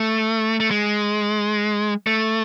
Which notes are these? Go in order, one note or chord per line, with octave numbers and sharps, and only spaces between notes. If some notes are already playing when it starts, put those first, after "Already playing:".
Already playing: A3
A3
G#3
A3